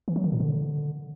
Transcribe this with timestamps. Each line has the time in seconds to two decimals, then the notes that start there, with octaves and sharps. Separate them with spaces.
0.08 E3
0.16 F#3
0.24 D#3
0.32 A#2
0.40 D3